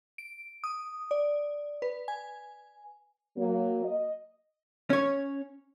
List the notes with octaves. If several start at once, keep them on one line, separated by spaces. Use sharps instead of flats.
D7
D#6
D5
B4
G#5
F#3 A#3
D#5
C#4 C#5